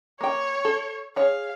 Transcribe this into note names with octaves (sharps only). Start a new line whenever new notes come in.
A#3 C#5 G5
A4
G#4 C#5 F5